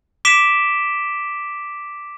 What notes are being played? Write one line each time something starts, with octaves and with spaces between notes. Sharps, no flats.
D6 B6 D7 E7 G7